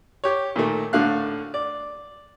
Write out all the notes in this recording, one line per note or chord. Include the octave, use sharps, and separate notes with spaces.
G4 C#5
A#2 D#3 A3
A2 D3 A3 F5 F#6
D5